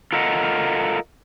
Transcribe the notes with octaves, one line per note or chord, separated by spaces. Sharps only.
F4 A4 A#4 D#5 F#5